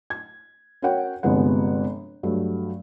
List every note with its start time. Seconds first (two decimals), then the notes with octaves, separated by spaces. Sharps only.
0.10 G#6
0.82 C#4 F#4 A#4 C#5 F#5 G5
1.23 G1 C3 F3 G#3 B3 F#5
2.23 G2 F#3 A3